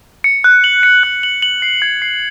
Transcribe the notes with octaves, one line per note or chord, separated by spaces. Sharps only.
C#7
F#6
F#7
C#7
F#6
F#7
F#7
C7
G#6
C7